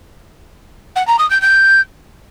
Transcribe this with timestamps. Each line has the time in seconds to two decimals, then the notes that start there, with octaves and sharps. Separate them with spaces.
0.96 F#5
1.07 A#5
1.19 D#6
1.30 G6
1.42 G6